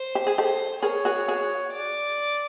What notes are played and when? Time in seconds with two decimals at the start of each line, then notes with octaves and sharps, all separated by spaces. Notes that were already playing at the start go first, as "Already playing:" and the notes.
Already playing: C5
0.15 G4
0.27 G#4
0.38 G4 A4 C5
0.82 G#4 A#4 C#5
1.05 F#4 G#4
1.28 F#4 G#4
1.74 D5